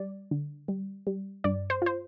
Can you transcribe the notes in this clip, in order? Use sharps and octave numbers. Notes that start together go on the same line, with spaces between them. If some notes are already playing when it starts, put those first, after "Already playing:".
Already playing: G3 D5
D3
G3
G3
G2 D5
C5
F4 C5